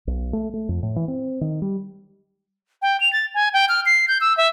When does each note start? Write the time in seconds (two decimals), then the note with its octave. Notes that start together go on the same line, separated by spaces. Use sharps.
0.07 B1
0.33 A3
0.54 A3
0.69 F2
0.83 A2
0.96 E3
1.08 C4
1.41 D#3
1.62 G3
2.82 G5
3.00 F7
3.13 A6
3.34 G#5
3.54 G5
3.69 F6
3.86 C7
4.08 G6
4.21 E6
4.37 E5